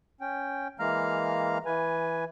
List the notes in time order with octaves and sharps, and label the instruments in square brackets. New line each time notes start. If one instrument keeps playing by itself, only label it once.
[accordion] C#4 G5
E3 G#3 A#3 F5 A#5 F6
E3 B4 G#5